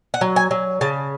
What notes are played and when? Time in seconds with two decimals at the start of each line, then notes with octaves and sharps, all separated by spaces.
0.14 F#5
0.21 F#3
0.36 G#5
0.51 F#3
0.81 C#3 A5